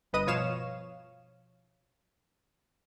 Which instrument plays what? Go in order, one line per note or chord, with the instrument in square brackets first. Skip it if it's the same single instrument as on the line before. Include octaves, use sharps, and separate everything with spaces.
[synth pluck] G1 G2 B4 D#5 D#6 D#7
B2 F3 C#5 F5 E7